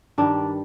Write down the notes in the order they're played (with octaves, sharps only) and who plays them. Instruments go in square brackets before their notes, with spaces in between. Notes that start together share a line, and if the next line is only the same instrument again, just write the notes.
[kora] G2 D#3 G3 D4